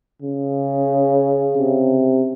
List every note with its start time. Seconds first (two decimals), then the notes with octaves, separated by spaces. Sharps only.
0.22 C#3
1.58 C3